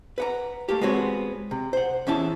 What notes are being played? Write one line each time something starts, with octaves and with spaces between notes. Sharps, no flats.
B4 F#5 A#5
A3 A#3 G4
G#3 B3 C4 F#4 C#5
C3
C5 F#5
E2 C#4 E4 A5